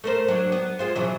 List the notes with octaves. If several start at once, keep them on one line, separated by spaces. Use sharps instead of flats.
A3 A#4 C5
F#3 D4
B3
G#3 F4 C5
B2 E3 F#3